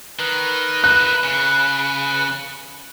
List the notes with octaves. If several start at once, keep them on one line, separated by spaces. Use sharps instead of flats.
D#3 B4
D#4 E4 F#6
C#3